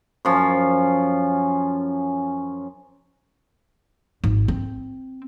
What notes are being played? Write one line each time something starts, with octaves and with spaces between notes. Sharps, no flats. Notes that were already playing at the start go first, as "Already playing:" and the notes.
F#2 F3 C#4
G#1
C4